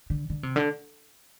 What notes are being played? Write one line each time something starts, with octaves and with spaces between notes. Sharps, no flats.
D3
D3
C3
D3